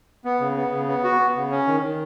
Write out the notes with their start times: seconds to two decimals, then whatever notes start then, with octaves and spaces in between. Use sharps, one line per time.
0.25 B3
0.40 C#3
0.57 B3
0.71 C#3
0.88 B3
1.04 F#4
1.19 B3
1.36 C#3
1.51 C#4
1.67 D#3
1.83 D#3